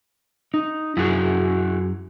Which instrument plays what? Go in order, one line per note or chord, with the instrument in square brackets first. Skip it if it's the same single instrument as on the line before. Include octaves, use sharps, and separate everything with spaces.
[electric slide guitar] D#4
[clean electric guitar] F#2 [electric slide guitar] E4 F#4 G#4